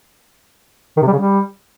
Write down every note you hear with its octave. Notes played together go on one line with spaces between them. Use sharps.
D#3
C3
G3
C#3
G3